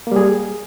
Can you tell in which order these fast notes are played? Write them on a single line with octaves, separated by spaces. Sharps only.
A#3 G3 G#4